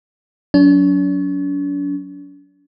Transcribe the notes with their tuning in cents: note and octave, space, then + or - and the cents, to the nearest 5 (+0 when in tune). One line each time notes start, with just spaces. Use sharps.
F#3 +0 D4 -45